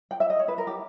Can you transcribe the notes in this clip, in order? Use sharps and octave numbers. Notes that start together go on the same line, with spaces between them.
G5
E5
D#5
C#5
B4
A#4
G4